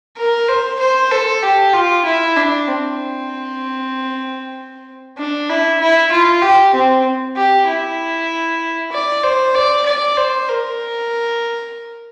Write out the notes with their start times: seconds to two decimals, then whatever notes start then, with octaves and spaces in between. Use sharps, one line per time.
0.17 A#4
0.48 C5
0.80 C5
1.11 A4
1.43 G4
1.74 F4
2.05 E4
2.36 D4
2.68 C4
5.18 D4
5.49 E4
5.80 E4
6.12 F4
6.42 G4
6.74 C4
7.36 G4
7.68 E4
8.92 D5
9.24 C5
9.55 D5
9.86 D5
10.18 C5
10.49 A#4